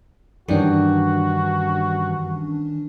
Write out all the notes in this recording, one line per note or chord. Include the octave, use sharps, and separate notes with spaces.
G2 D#3 E3 C#4 D4 F#4